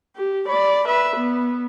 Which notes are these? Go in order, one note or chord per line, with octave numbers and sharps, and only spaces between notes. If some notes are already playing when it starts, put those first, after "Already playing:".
G4
D5 B5
B4 E5
B3